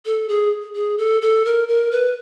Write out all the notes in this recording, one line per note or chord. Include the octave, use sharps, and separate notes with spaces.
A4
G#4
G#4
A4
A4
A#4
A#4
B4